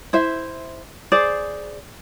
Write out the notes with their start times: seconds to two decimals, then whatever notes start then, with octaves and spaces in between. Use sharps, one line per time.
0.13 E4 C5 E5
1.12 G#4 C5 D5